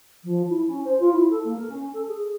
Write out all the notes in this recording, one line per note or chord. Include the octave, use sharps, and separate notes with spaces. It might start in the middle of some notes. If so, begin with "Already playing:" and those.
F3
E4
C#4
C5
F4
E4
A4
A#3
A#4
C#4
A4
G#4